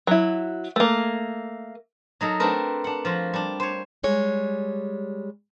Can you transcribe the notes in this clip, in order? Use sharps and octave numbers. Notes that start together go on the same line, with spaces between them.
F#3 E4
A3 A#3
F#3 D#4 A4 A#4
A3 C4 D4 G4 A#4 B4
D4 F#5
F3 F4 F#4
G3 D4
C5 C#5
G3 G#3 C#5